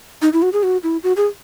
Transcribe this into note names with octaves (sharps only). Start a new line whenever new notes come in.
D#4
E4
F#4
G#4
F#4
E4
F#4
G#4